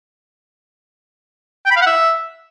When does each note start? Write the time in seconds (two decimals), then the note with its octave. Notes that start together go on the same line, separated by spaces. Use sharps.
1.66 G5
1.71 B5
1.76 F5
1.81 F#5
1.87 E5